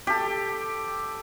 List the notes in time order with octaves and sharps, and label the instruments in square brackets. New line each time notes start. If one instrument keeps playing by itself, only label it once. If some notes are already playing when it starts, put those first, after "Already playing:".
[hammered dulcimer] G4 A4